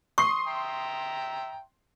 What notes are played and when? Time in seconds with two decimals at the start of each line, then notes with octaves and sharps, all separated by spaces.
0.18 C6 C#6 D#6 C7
0.47 E5 G5 A#5